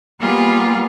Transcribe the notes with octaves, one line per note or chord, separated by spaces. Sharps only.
G3 A#3 B3 F4 G4 G#4